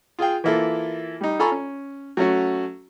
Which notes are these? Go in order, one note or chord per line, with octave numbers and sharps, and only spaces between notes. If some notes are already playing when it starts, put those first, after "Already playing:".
F4 G#4 F5 G5
E3 A#3 E4 F4 A4
G3 D#4
F4 A4 G#5 A#5 B5 C#6
C#4
F#3 A3 C#4 F#4